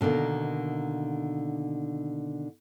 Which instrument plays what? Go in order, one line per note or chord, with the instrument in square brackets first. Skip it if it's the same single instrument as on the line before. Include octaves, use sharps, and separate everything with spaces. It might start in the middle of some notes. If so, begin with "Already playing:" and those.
[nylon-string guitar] B2 D3 D#3 A#3